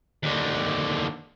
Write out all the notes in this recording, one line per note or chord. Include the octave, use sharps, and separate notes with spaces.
D#2 D3